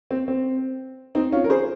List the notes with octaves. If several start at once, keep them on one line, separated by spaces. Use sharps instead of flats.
C4
C4
C4 D#4
C#4 F4
A#4
G#4 C5